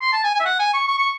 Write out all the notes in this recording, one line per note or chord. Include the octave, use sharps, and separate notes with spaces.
C6
A5
G#5
G#5
E5
F#5
G#5
C#6
C#6
C#6